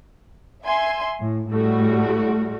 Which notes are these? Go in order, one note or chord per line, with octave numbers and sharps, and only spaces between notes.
E5 G#5 C6
A2
A2 G3 A3 F#4